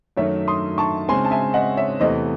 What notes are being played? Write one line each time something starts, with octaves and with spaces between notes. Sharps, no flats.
F#2 D#3 F#3 A3 C#5 E5
C6 D#6
A5 C#6
C#3 G#3 C4 G#5 C6
A5
E5 G#5
D#5 F#5
C#5 E5
E2 C3 E3 A3 C5 D#5